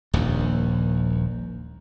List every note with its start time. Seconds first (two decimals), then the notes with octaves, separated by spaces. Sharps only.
0.14 D#1 A#1 D#2